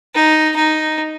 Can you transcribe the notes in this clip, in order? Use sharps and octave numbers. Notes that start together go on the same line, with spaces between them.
D#4
D#4